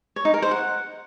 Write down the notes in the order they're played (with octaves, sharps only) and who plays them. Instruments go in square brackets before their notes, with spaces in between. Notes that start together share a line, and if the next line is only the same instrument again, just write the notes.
[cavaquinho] C#5
D#4
A#4
C5
F#5